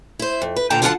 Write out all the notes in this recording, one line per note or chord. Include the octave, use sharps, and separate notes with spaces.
E4 C5
F2
B4
D2 A#2 D3 G5 A5 A#5
D3 F#3 F4 G4 F#5 A5